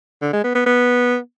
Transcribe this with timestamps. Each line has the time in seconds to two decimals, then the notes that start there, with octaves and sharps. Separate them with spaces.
0.22 D3
0.33 G#3
0.44 B3
0.55 B3
0.66 B3